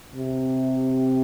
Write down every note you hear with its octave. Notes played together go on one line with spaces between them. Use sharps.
C3